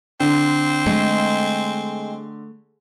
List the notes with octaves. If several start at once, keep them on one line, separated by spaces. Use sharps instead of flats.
D3 C4
G#3 A3